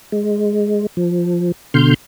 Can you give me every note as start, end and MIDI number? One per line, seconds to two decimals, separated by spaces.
0.12 0.87 56
0.97 1.52 53
1.74 1.94 47
1.74 1.94 50
1.74 1.94 84
1.74 1.94 89
1.74 1.94 91